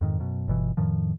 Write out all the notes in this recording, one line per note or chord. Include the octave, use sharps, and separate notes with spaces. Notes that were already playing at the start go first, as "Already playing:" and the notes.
F2 G#2 D#3
F#2 B2
G1 B2 E3
F2 A2 D#3 F3